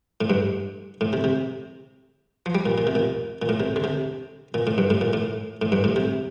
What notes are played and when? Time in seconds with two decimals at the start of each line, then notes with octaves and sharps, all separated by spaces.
0.21 A2
0.30 G2
1.01 A2
1.13 C3
1.24 C3
2.46 F3
2.55 G3
2.66 A#2
2.78 A#2
2.87 C3
2.95 A#2
3.42 A#2
3.49 A2
3.60 C3
3.76 D3
3.84 C3
4.54 A#2
4.67 A2
4.78 G2
4.90 A2
5.01 A#2
5.13 A2
5.62 A2
5.72 G2
5.84 A2
5.96 C3